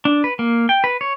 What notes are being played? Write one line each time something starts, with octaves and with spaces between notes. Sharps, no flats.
D4
B4
A#3
G5
B4
C#5